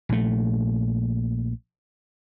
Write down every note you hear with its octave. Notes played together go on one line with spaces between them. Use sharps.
A#1 A3